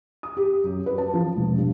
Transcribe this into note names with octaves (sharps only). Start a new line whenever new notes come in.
D#6
G4
F#2
B4
A5
F3
E1
G2